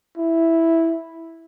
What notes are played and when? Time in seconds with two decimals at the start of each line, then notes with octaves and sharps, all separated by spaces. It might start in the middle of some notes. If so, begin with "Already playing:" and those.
0.17 E4